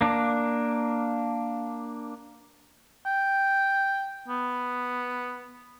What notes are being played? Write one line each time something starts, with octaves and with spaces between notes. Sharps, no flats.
A#3 D4
G5
B3